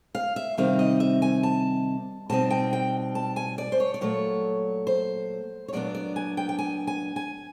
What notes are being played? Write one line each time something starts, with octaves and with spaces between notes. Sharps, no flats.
F5
E5
C3 D#3 G3 C4 D#4 F5
D#5
E5
G#5
A5
B2 G3 C4 D#4 A5
G5
G5
A5
G#5
D5
C5
C#5
D5
A#2 F#3 A3 C#5
C5
C#5
A#2 F#3 B3 D4 D5
D5
G#5
G5
G5
G#5
G#5
G#5